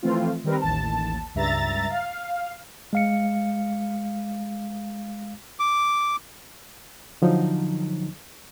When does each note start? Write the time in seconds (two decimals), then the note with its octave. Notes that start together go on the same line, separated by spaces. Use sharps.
0.03 E3 F3 A3 C4 F4
0.44 D#3 G3 C4 A#4 B4
0.61 A1 D#2 A5
1.35 C#2 G2 E5 A#5 A6
1.90 F5
2.93 G#3 F5 C#7
5.59 D6
7.22 D3 F3 F#3 D#4